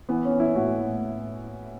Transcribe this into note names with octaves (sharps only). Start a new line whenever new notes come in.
E3 B3
C#4
E3
E4
A2 F#4
A2